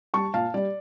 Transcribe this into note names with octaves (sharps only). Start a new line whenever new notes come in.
G3 A5 C#6
A#2 F5 A5
G3 D5